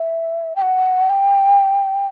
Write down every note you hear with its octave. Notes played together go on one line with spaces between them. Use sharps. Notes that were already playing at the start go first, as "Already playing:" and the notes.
Already playing: E5
G5
F#5
G5